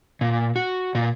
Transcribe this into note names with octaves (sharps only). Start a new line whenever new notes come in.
A#2
F#4
A#2